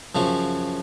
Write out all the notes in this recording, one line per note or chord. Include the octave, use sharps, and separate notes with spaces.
F#2 C#3 F3 C#4